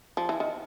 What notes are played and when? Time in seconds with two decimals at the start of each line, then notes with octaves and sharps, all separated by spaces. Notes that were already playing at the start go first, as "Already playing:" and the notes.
0.17 F3
0.29 E3
0.40 D#3